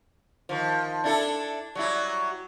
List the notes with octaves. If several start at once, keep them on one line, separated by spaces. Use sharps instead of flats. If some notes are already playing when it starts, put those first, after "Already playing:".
D#3 F3
D4 E4 A4
F#3 G3 E4